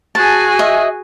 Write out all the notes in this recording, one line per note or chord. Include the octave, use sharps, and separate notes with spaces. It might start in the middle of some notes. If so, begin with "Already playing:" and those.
F#4 G#4 G#5 A5
D#5 E5